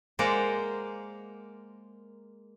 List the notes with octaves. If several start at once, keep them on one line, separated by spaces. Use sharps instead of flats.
G#3 A#3 A#4 C5 D5 F#5